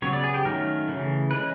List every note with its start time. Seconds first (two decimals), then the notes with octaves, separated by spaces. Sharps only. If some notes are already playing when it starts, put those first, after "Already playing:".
0.02 C#3 F#3 B3 C#5
0.13 D5
0.24 G#4
0.34 G4
0.45 D#3 F#3 A3 C#4 A#4
0.89 C#3 E3 A3
1.31 E3 G#3 C#4 B4